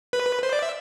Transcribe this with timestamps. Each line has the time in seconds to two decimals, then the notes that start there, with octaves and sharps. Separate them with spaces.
0.13 B4
0.43 C5
0.53 D5
0.63 E5